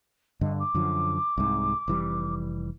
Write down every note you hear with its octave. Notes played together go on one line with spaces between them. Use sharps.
G2 D3 D#5
D6
F#2 D3 F3
C2 G#2
F1 E3 G3